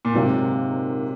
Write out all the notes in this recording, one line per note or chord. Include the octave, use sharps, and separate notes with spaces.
A#2
G#2 C3 F#3 A#3 F4